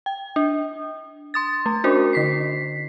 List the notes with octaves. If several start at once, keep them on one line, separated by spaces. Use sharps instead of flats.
G5
D4
C6 D#6 A6
A3
C#4 D4 F#4 A#4 C5
D3 B6 C7